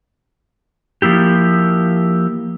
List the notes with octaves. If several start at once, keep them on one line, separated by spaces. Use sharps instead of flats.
F3 A#3 E4 G4